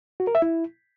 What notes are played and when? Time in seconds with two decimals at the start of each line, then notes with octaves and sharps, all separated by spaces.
0.20 F#4
0.27 A#4
0.35 E5
0.42 E4